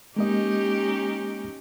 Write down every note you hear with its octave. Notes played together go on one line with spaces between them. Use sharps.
G#3 A#3 C#4 D#4 G4 D#5